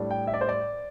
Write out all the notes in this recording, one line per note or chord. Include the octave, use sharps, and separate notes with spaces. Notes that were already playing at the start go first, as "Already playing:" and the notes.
Already playing: A2 G3 D4
G5
E5
D5
C5
D5